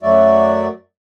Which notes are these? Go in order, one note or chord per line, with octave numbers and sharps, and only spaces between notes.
F#2 F#3 A3 F#4 D5 E5